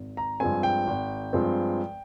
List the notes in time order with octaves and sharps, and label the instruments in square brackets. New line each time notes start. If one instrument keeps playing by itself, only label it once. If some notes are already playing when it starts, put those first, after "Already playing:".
Already playing: [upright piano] G#1
A#5
G2 F3 G#3 C4 G#5
G5
G#1
G2 F3 G#3 C4